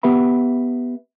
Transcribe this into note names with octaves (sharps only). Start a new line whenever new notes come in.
B3 G4 B4 E5 B5